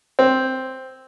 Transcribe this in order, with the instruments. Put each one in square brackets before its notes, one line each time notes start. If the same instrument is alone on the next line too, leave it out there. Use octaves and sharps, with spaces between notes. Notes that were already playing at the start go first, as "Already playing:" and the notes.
[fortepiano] C4